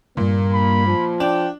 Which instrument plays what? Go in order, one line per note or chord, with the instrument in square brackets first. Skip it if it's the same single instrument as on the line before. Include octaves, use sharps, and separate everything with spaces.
[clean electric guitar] C#2 G2 [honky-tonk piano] A#2 [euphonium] A#3
[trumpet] B5
[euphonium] F3
[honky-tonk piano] D4 [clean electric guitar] D5 [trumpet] G5